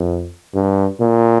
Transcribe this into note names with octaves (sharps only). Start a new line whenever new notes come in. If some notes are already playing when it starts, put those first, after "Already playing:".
Already playing: F2
G2
A#2